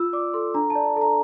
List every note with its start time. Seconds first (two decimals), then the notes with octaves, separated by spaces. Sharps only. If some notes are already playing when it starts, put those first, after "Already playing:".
Already playing: F4 E6
0.13 D5 D6
0.34 A4 C6
0.54 D4 A#5
0.70 D5 A5
0.96 A4
1.01 A#5